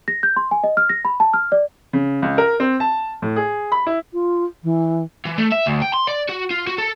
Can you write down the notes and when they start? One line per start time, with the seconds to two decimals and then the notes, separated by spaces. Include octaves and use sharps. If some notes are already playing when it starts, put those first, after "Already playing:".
0.08 A#6
0.23 G6
0.36 C6
0.51 G#5
0.63 D#5
0.77 F6
0.89 A#6
1.05 B5
1.20 A5
1.34 F6
1.52 D5
1.93 C#3
2.22 C#2
2.38 A#4
2.60 C4
2.80 A5
3.22 A2
3.36 G#4
3.72 B5
3.87 E4
4.13 F4
4.64 E3
5.26 E3
5.38 A3
5.52 E5
5.66 D2
5.82 G5
5.94 C6
6.08 D5
6.29 F#4
6.51 F4
6.67 F#4
6.78 A4